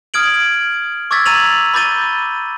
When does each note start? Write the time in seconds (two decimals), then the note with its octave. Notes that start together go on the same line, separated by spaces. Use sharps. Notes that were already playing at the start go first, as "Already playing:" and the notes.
0.14 D#6 F6 G#6 D7 F#7
1.11 C#6 D6 E6 G#6 A6 B6
1.25 A#5 E6 A6 D#7 F7 F#7
1.74 B5 D6 G6 A6 D#7 G7